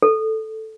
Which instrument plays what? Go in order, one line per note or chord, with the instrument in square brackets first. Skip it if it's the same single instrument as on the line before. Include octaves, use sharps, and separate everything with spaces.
[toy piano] A4